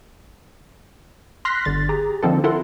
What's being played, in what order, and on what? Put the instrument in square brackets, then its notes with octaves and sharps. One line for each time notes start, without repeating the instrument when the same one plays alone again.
[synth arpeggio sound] C6 F6 F#6 A#6 B6
G1 D3 A6
G4 G#4 A#5
D3 F3 A#3 C4 D#4 A4
E4 F4 A4 A#4 F#5 C6